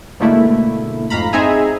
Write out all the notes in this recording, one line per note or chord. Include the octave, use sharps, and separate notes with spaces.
G#2 B2 D3 A3 A#3 E4
F2 G#2 F5 A#5 B5
C4 D#4 G#4 E5 G#5 A#5